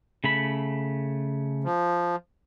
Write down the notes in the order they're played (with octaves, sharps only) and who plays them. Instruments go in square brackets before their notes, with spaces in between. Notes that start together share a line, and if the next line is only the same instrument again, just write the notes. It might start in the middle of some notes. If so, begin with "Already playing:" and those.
[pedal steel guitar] C#3 A3 B5
[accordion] F3